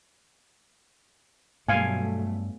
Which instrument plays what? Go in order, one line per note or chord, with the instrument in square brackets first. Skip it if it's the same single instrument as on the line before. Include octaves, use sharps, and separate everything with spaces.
[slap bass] G2 [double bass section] B2 F#3 A3 [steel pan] F5 G#5